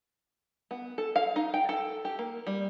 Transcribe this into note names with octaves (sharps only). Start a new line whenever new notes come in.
B3
A4
F5
D#4
G5
A4
G4
A#3
G3